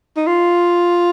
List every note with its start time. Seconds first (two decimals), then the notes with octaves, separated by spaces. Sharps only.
0.17 D#4
0.27 F4